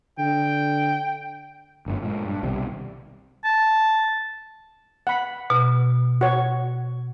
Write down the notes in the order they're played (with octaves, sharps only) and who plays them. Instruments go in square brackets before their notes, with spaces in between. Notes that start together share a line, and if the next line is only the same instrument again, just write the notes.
[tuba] D3 [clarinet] G5
[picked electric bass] G1 F#2 A2
A#2 G#3
G2
B1 C3 D#3 G3
[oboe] A5
[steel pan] F#5 B5
[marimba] B2
[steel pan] F#4 C#5